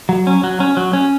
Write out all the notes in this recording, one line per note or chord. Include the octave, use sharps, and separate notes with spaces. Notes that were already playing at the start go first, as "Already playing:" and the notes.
F#3
C#4
F#3
C#4
F#3
C#4